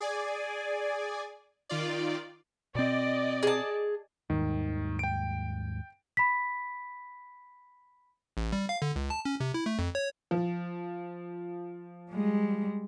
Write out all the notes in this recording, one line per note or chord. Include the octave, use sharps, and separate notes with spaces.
G#4 D5 G#5
D#3 F4 D5
B2 C4 D5 D#5
G#4 A5
D#2 G#2 D#3 G3
G5 D7
B5 B6
A1
G3
F5
D3
C#2
A5
C#4
C3
E4
A3
F2
C#5
F3
G3 G#3